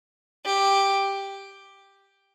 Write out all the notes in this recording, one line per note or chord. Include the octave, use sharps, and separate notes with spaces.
G4